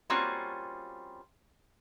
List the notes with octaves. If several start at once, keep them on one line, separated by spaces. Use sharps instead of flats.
G3 A#3 C4 C#4 F4 F#4